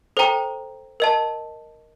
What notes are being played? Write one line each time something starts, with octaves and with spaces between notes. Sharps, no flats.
A4 C5 G5 A#5
A#4 D#5 A5